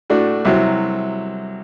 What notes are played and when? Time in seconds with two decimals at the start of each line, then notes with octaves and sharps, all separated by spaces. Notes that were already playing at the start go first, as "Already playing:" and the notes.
0.10 A2 A3 D4 F#4
0.45 C2 C3 F#3